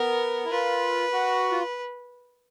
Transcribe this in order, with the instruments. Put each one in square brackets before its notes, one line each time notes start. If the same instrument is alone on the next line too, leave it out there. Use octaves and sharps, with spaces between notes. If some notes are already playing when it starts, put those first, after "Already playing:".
Already playing: [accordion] B3 [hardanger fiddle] A#4
[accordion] E4
[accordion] F4 [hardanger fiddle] B4
[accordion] F#4
F4